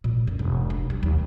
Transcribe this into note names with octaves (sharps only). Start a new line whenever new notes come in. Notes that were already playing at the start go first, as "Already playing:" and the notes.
A#2
F#2
E1
D4
G3
D#2